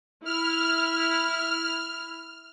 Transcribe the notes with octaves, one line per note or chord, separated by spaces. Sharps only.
E4 F6